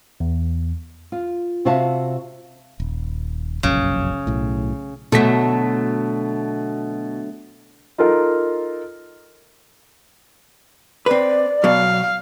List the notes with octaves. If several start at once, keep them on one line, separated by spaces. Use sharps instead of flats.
E2
F4
C3 F4 F#4 E5 F5 A5
D#1
F1 A#1 F#2 C#3
B1 A2
B2 D3 F#3 A3 B6
D#4 F4 A4 A#4
C4 B4 D5
B2 F#3 F5